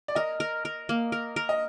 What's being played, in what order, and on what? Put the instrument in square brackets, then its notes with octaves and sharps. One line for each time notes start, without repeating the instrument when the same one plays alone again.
[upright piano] D5
[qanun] A#4 [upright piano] D#5
[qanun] A#4
A#4
A#3
A#4
A#4
[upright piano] D#5